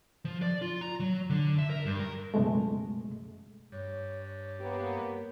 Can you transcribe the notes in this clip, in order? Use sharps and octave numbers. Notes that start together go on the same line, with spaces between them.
F3
D5
F4
A#5
F#3
D3
E5
A#4
G2
A#4
C#2 F#2 B2 G#3 A3
G2 C#5
A#3 B3 G4